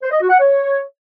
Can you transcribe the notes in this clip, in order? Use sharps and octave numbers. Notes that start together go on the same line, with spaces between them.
C5
D#5
F#4
F#5
C#5